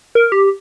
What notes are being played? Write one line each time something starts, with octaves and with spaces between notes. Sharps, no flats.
A#4
G4